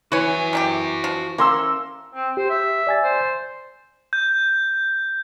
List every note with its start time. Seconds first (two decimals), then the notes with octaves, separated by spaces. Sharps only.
0.12 E3 F#4 B4 C#5 G#5
0.53 C3 D#4 G4
1.04 F3
1.38 A#3 C#4 A4 C6 E6
2.15 C4
2.37 G4 C5
2.50 E5
2.87 D5 G#5 A6
3.04 C5
4.13 G6